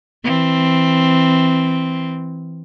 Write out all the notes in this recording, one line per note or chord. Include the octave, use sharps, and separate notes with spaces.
E3 C4